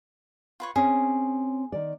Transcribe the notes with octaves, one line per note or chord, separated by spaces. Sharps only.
F4 B4 C#5
C4 C#4 G#4 C#5
D#3 D5